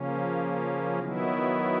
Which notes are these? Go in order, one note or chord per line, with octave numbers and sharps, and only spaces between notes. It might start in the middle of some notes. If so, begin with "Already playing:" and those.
Already playing: C#3 F3 A#3 C#4
D#3 F#3 B3 E4